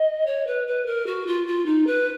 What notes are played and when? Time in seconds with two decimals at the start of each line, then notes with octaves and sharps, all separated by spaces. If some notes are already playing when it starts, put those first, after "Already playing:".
Already playing: D#5
0.26 C#5
0.47 B4
0.67 B4
0.86 A#4
1.07 F#4
1.27 F4
1.47 F4
1.66 D#4
1.87 B4